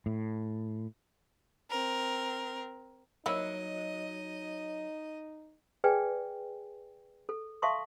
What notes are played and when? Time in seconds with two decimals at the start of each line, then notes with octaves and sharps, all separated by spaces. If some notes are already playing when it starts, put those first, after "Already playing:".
0.06 A2
1.70 C4 A#4
3.26 F#3 A#3 D#4 E4 D#5
5.84 G#4 B4 D5 G5 G#5
7.29 A4
7.62 E5 F5 A5 C6 C#6 D#6